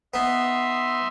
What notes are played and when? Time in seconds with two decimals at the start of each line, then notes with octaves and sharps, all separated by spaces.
0.14 B3 D#4 E5 C6